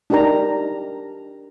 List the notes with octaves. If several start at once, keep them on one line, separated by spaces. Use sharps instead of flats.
D4 D#4 G4 A#4 A#5